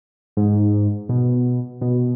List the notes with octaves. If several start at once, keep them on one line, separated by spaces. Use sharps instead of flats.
G#2
B2
B2